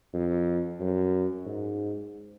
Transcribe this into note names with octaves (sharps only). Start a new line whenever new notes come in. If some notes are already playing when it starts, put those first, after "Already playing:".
F2
F#2
G#2